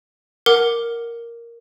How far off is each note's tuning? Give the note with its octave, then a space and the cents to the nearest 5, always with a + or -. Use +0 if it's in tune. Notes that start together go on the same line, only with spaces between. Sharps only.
A#4 +0 F#5 +0 D6 +0